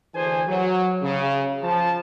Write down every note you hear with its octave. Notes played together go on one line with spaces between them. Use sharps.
D2 E3 D4 G#4 C5 G#5
F#3
C#3
F3 A5